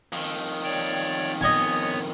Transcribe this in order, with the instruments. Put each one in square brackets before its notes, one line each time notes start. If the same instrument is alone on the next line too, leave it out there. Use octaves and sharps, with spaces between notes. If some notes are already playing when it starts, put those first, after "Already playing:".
[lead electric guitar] F2 D#3
[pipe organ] C#5 D5 G5
[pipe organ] B3 C#5 [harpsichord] D#5 G#5